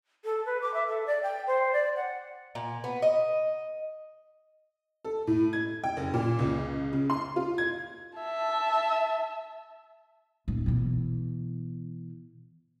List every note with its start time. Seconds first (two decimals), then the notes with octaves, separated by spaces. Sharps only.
0.25 A4
0.46 B4
0.62 D6
0.74 E5
0.88 A4
1.07 D5
1.23 G5
1.47 C5
1.73 D5
1.96 F#5
2.55 A#2
2.84 B3
3.02 D#5
5.05 A4
5.27 A2
5.53 G#6
5.84 G5
5.97 F#1
6.14 A#2
6.39 C#2
6.93 C#3
7.10 C6
7.36 F4
7.58 G#6
8.18 E5 A5
10.48 D#1
10.66 B2 E3